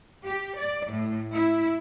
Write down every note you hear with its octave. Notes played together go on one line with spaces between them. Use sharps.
G4
D5
A2
E4